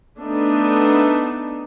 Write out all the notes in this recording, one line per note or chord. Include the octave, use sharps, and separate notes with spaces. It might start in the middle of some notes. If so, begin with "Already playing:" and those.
A3 B3 D4 D#4